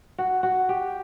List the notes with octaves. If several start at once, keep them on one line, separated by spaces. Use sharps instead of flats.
F#4
F#4
G4